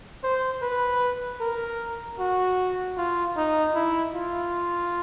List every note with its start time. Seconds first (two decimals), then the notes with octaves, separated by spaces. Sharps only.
0.23 C5
0.62 B4
1.40 A#4
2.19 F#4
2.97 F4
3.36 D#4
3.75 E4
4.14 F4